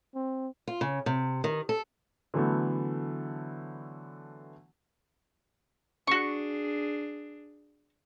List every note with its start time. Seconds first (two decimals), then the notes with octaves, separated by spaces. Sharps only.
0.15 C4
0.67 F4
0.81 C#3
1.06 C3
1.44 D#3
1.69 A4
2.34 D3 E3 F#3 A3 B3
6.07 D4 F#4 G#4 C#6